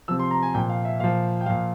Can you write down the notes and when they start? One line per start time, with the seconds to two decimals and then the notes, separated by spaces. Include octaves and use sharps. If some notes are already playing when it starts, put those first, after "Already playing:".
0.08 C3 F3 E6
0.19 C6
0.31 A#5
0.43 G#5
0.54 A#2 F3 G5
0.69 F5
0.85 E5
1.00 A#2 F3 F5
1.41 G5
1.46 A#2 F3 F5